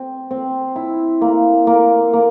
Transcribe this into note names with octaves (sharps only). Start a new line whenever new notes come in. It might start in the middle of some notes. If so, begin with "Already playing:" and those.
Already playing: C4
C4
E4
A#3
A#3
A#3